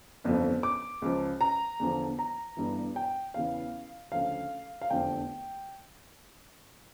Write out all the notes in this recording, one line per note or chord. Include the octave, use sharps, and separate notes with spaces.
G1 F2 C#3 F3
D6
C#2 C#3 F3
A#5
E2 D3 F3
A#5
G1 G2 E3
G5
E2 C#3 E3 F5
D2 C#3 F3 F5
F5
F1 E2 D3 F3 G5